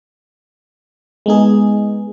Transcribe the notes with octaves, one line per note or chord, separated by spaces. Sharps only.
G#3 B3 D#4 G#4